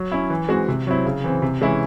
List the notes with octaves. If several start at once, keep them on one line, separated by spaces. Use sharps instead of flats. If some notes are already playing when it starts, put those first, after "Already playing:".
Already playing: F#3
C#4 E4
E3
G#3 C4 F#4
C3
F#3 C4 E4
C#3
E3 C4
C3
E3 G#3 C#4 E4